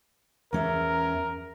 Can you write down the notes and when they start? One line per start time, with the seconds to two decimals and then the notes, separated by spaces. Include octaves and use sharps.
0.53 E2 C#4 A#4 E5